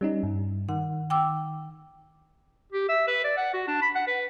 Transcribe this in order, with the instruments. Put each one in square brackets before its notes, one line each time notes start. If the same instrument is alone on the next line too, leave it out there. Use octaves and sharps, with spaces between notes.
[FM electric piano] G3 C#4 D#4
G2
[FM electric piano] D#3 [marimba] F#5
[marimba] G5 D6 E6
[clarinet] G4
E5
B4
D5
F#5
F#4
D4
B5
F#5
B4